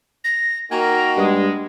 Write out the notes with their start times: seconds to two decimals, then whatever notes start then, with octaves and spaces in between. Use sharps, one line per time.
0.24 A#6
0.71 A#3 D#4 F#4 A#4 G5 G#5 A#5
1.17 G2 G#3